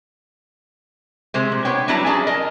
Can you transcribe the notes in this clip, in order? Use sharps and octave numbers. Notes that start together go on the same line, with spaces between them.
C3 G#3 C5
A#2
B3 D4 C#5 G5
F#3 G3 D4 E4 A5 A#5
C#4 F#4 G#4 D5 A5
A#4 D#5